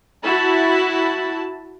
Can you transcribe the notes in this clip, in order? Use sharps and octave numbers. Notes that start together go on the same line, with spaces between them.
E4 F#4 A5 B5